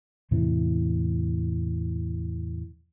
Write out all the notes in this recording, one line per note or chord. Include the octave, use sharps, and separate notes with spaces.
E2 A2 C3 E3